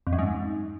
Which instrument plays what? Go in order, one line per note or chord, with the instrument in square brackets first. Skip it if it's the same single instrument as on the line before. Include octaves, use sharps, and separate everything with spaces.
[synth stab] F2
F#2
G#2